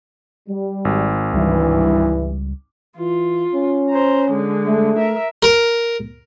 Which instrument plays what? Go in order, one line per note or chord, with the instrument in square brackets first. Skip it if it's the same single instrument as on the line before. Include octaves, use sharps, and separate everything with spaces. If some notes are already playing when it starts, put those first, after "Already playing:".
[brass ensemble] G3
[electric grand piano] G#1
[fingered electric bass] C#2 G3 [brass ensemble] G2 E3
[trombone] E3 [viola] F4
[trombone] C#4
[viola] C5 A#5
D3 G#3
[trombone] A3
[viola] A#4 E5
[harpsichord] A#4